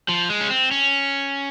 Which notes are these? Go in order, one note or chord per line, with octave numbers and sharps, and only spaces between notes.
F3
G#3
C#4
C4
C#4